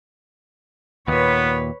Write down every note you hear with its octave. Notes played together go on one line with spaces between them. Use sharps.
D#2 A#2 B3 B4 C#5